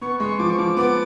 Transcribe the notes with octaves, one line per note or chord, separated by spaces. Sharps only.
B3 C#6
G#3 C#6
F3 D6
C#6
F3 D6
B3 D6